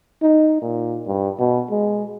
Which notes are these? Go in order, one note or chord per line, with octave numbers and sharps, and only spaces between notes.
D#4
A#2
G2
B2
G#3